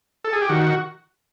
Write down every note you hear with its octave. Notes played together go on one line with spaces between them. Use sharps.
A4
G#4
G4
D#3 F#4